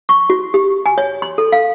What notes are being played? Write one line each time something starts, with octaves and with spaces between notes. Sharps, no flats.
C#6
F#4
G4
G#5
C#5
C6
A4
F5